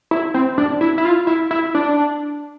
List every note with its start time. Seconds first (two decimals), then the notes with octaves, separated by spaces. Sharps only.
0.11 E4
0.34 C4
0.58 D4
0.81 E4
0.98 E4
1.05 F4
1.27 E4
1.51 E4
1.75 D4